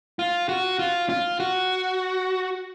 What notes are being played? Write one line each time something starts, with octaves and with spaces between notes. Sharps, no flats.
F4
F#4
F4
F4
F#4